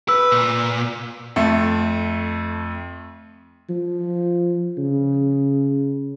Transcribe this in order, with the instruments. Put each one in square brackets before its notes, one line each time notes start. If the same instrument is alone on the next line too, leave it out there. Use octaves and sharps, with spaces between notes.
[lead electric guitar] B4 [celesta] E6
[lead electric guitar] A#2
[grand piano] F2 A3
[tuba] F3
C#3